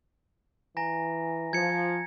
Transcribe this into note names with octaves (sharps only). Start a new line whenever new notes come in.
E3 G#5 A#5 A#6
F3 G#6 C#7